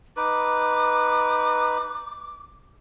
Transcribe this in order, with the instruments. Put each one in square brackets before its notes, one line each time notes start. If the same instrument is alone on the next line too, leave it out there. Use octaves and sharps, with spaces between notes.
[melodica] D#4 B4 [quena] D6